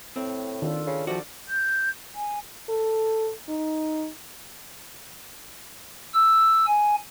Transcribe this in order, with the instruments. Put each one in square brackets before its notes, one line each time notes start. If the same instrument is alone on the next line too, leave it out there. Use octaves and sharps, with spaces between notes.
[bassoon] A2 [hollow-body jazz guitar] C4
[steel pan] D#3 [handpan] D4 F4 A4
[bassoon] C#3
[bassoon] C3 [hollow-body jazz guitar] F3 F#4 [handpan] D5
[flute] G6
G#5
[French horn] A4
D#4
[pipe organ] E6
G#5